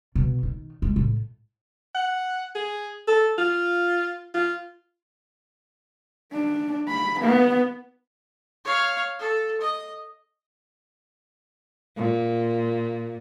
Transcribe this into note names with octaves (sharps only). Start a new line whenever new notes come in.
B2
D#3
G#3
A2
F#5
G#4
A4
F4
F4
D4
B5
B3
C#5 F5
A4
D#5
A#2